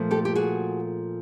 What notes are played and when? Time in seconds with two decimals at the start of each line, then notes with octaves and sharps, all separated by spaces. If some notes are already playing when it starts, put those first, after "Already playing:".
Already playing: A#2 F3 A3
0.11 G4 A4
0.25 G4
0.35 F#4 G#4